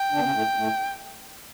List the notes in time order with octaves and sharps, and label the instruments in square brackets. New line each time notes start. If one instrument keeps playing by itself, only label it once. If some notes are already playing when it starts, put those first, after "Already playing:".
Already playing: [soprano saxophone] G5
[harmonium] D3 D4
B3
C#3 C#4
A2 A3
A2 A3